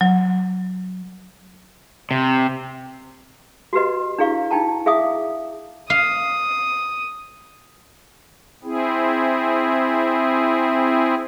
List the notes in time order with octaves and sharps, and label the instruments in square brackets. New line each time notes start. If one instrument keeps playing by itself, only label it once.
[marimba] F#3
[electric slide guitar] C3
[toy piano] F#4 G4 B4 D#5
D4 E4 G#4 F5 C#6
D#4 E4 G5 A5 A#5
G#4 E5 F5 G#5 D6 D#6
[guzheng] F5 [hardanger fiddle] D#6
[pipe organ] C4 E4 G#4